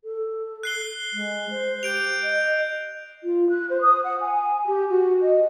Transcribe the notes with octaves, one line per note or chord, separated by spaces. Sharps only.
A4
F#6 C7 G7
G#3
C5
G4 G6 D7 F7
D#5
F4
F#6
C5
D#6
F#5
G#5
G4
F#4
D#5